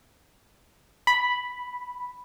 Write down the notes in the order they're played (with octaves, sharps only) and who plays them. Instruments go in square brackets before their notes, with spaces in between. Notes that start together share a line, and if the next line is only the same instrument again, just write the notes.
[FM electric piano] B5